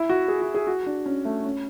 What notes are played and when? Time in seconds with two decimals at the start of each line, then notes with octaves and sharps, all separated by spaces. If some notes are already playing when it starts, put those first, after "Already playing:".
Already playing: E4
0.09 F#4
0.28 G#4
0.41 F#4
0.55 G#4
0.67 F#4
0.86 D4
1.06 C#4
1.25 A3
1.45 C#4